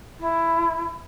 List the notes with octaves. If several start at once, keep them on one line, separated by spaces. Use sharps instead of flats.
E4